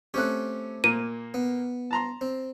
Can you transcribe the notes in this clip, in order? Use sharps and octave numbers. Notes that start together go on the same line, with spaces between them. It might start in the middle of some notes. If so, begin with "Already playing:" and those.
A3 C4 C#4 G4 F#6
A#2 A#3 D#7
B3
A5 A#5 C6
C4